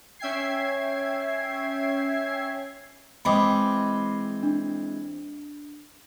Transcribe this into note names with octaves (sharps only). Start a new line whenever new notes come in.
C#4 E5 G5 G#6 C7
E3 G#3 C4 B5 D6 D#6
D4